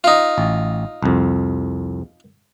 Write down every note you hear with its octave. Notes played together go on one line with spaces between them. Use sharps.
D#4 F4
A1
C2 F2